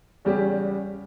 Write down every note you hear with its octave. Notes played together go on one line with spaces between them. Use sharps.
E2 C#3 G3 C#4 G4